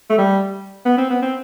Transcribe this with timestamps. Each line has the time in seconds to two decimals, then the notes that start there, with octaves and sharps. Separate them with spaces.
0.10 A3
0.18 G3
0.86 B3
0.97 C4
1.10 B3
1.22 C4